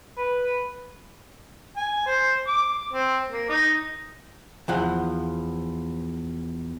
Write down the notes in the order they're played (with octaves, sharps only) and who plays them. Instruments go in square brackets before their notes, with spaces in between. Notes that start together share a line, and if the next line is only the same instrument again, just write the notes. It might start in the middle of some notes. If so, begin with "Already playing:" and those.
[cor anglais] B4
[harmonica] G#5
C5
D6
C4
A#3
D#4
[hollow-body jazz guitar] E2 F3 F#5